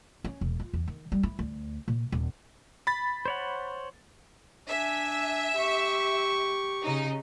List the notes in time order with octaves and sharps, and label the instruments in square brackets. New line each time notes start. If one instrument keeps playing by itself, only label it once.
[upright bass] C#4
E1
F4
E2
D#3
G3
E4
D2
A#2
D#1
[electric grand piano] B5 A6
[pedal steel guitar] C5 C#5 F#5
[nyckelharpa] D4 G#5 [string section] E5
[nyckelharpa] G4 C#6
[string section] C#3 D#4